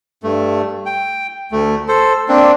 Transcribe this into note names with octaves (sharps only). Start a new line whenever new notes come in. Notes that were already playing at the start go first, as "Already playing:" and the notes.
G2 A3
G5
D2 A3
A4 C5
A#3 C4 D4